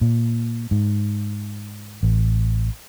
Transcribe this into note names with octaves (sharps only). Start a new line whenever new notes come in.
A#2
G#2
A1